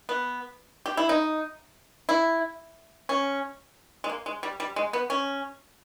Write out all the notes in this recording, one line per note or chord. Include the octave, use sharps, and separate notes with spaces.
B3
G4
E4
D#4
E4
C#4
G#3
A#3
G#3
G3
G3
G#3
B3
C#4